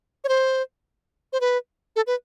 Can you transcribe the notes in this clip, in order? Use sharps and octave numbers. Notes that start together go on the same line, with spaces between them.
C#5
C5
C5
B4
A4
B4